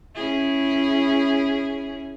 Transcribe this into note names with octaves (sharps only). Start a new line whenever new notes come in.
C#4 E4 G#4